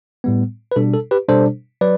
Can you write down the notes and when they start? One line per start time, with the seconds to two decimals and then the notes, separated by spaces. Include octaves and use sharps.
0.24 A2 G3 B3
0.72 B4
0.76 B2 G3 D4 A4
0.94 A4
1.11 G4 B4
1.29 B2 G3 D4 A4 C5
1.81 F#3 B4 D5